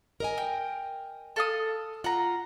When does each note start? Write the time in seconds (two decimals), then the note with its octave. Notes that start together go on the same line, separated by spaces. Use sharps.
0.20 A#4 D#5 G#5
0.38 G5
1.36 A4 F5 D#6
2.04 F4 F#5 A#5